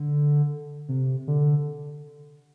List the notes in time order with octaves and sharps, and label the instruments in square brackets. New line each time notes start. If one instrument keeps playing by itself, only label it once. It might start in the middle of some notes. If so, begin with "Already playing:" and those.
Already playing: [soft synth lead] D3
C3
D3